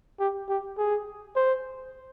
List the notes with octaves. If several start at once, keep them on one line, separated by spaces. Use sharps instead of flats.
G4
G4
G#4
C5